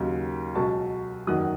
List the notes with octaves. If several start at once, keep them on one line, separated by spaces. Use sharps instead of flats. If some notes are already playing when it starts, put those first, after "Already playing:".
Already playing: D#2 C#3 F#3
C#2 B2 F#3 A5 C#6
F#1 E2 D#3 F#3 D#6 F#6